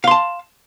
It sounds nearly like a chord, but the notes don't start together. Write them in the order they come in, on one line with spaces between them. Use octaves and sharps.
F5 C6 A5